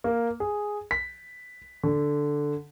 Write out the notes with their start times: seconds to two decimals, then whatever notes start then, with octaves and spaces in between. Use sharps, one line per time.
0.04 A#3
0.40 G#4
0.91 B6
1.84 D3